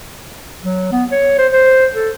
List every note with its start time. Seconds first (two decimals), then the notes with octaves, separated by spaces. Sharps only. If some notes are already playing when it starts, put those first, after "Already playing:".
0.63 F#3
0.92 B3
1.12 C#5
1.38 C5
1.52 C5
1.94 A4